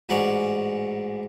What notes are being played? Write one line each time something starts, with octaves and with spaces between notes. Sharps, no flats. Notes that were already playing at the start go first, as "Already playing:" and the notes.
A1 G#2 F#4 D5 A#5 C#6